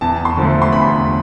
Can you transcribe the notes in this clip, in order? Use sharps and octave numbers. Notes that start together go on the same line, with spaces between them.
E2 A5
C6
D3 F3 A3
C6
E2 B5